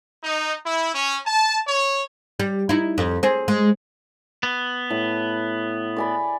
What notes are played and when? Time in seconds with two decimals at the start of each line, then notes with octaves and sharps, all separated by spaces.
0.23 D#4
0.64 E4
0.95 C#4
1.26 A5
1.67 C#5
2.40 G3
2.69 D#4 E4
2.98 F2
3.23 C4 G#4
3.48 G#3
4.43 B3
4.90 A2
5.96 D5 G#5 B5